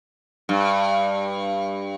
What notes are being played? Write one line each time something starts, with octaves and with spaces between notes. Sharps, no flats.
G2